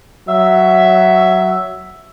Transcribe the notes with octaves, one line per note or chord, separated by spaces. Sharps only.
F#3 E5